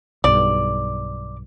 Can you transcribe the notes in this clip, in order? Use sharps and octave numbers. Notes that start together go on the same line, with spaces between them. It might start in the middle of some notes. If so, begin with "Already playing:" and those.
B1 G2 D5